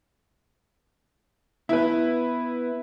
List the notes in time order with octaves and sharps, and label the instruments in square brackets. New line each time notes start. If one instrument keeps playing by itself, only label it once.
[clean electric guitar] B3 E5 [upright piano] E4 B4